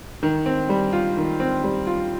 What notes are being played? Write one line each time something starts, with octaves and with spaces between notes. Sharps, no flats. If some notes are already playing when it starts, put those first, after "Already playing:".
D#3
C4
G3
F4
D#3
C4
G3
F4